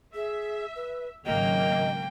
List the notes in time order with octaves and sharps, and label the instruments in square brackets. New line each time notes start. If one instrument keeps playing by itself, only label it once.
[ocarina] G#4 [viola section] E5
[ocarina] B4
[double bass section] G#1 C#3 F#3 [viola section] A#3 [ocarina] D#5 [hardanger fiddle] G5